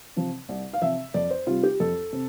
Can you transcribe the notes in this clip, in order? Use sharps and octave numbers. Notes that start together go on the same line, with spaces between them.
C3 F3
C2
F5
C3 F3 E5
F2 D5
C5
C3 G3 F4
G4
F2 A4
C3